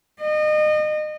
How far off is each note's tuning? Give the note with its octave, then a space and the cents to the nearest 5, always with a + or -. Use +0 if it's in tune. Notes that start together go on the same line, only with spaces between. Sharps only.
D#5 -30